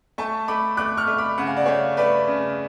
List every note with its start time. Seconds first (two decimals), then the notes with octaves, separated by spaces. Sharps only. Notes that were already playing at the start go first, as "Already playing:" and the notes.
0.18 A3 A5 C#6
0.48 A3 B5 D6
0.77 A3 D6 F#6
0.97 C#6 F6
1.07 A3
1.18 B5 D6
1.38 C#3 F#5
1.47 F5
1.57 D5
1.66 A3 C#5 F5
1.97 A3 B4 D5
2.28 C#3